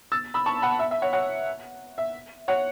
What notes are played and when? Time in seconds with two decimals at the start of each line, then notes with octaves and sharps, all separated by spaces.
0.12 E6 A6
0.34 B5 E6
0.46 A5 C#6
0.62 F#5 B5
0.79 E5
0.91 E5
1.02 C#5 F#5
1.13 C#5 F#5
1.98 E5
2.48 C#5 F#5